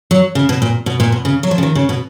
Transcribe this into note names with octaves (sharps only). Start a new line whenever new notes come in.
F#3
C#3
B2
A#2
B2
A#2
B2
C#3
F#3
F3
C#3
D#3
C#3
B2